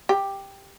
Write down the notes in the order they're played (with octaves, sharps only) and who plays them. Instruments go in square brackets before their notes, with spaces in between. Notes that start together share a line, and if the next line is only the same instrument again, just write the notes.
[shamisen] G4